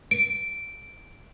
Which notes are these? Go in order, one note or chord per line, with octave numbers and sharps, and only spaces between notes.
D7